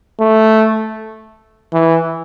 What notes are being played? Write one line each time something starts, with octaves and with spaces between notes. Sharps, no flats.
A3
E3